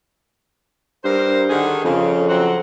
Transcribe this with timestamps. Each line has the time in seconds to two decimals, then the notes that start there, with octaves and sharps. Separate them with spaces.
1.04 G2 A#4 C5
1.49 D3 D#3 G#4
1.85 F2 C#3
2.28 F#3 C4 F#5